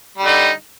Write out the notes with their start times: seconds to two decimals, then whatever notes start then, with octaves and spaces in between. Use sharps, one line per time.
0.18 G3
0.22 D3
0.26 D#4